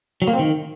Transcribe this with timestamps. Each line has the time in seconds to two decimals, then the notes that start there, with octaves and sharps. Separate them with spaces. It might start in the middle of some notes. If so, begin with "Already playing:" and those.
0.22 F#3
0.28 A#3
0.33 C4
0.39 D#3